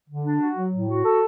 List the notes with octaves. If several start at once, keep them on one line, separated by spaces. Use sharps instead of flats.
D3
D4
F#4
F#3
A2
F#4
A4